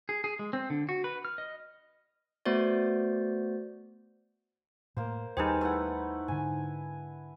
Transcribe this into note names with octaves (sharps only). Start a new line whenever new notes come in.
G#4
G#4
G#3
C4
D3
F#4
B4
F6
D#5
A3 B3 F#4 C5 D5
A2 A#3 C5
D#2 G3 D#4 G4 G#4 B4 C5
A3 E4 F#5
G#2 D3 G#5